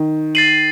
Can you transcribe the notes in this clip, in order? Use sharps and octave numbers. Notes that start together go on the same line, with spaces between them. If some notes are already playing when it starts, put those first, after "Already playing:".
Already playing: D#3
A6 C7 D#7 F#7